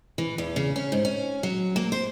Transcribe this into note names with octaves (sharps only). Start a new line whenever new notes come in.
E3
E2
C#3
C#4
G#2
C#4
F#3
A#3
C5